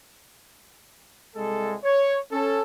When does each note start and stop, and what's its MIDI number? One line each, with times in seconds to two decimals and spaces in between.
1.36 1.75 36
1.36 1.75 56
1.36 1.75 69
1.84 2.18 73
2.31 2.62 61
2.31 2.62 69